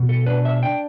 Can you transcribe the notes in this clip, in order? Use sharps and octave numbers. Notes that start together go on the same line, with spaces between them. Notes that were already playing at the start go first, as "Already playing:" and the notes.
Already playing: B2
A4
D4 B4
E5
D4 G5